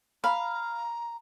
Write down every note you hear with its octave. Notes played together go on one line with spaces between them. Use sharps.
F5 A#5 B5